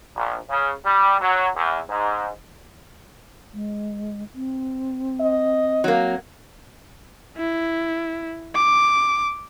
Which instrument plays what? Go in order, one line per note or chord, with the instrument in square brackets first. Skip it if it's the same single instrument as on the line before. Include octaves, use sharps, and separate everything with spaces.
[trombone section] A#1
C#3
G3
F#3
E2
G#2
[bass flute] G#3
C4
[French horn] D#5
[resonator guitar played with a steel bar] F#3 A#3
[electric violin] E4
D6